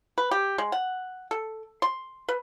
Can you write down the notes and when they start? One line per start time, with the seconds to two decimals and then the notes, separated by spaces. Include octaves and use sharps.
0.18 B4
0.31 G4
0.58 G#3
0.72 F#5
1.31 A4
1.82 C6
2.29 B4